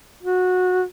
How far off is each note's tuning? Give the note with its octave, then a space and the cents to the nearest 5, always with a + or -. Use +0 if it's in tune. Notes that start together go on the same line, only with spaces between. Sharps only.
F#4 -20